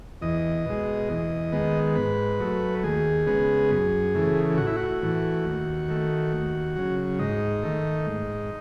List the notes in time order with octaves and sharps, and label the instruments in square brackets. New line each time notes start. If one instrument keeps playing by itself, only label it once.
[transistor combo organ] E2 D#5
B2 G#3
E2
D#3 G#3 B3
G#2 B4
F#3 A3
D#2 G#4
C#3 G#3 B3
F#2
C#3 E3 A3
A2 F#4
E4
F#4
E3 A3
D#2
D#3 A3
D#2
C#3 F#3
G#2 D#4
D#3 A3
G#2